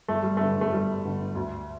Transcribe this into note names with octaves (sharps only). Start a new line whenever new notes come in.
G1 A3
G3
G2 D3 A3
A3
G1 G3
G2 D3
D2